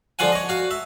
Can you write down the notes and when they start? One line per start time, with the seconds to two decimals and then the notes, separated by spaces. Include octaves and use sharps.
0.19 D3 F3 F4 F5 F#5 G#5
0.32 C#5 D#5
0.49 F#4 F5
0.71 E5